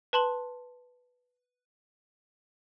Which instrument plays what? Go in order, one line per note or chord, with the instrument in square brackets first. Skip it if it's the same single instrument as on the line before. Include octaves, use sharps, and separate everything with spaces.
[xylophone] B4 A5 C6 F#7